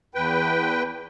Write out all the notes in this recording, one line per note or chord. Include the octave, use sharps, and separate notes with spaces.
E2 B4 G5